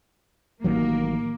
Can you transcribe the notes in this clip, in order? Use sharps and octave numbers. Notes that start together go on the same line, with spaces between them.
A1 D#3 F#3 A#3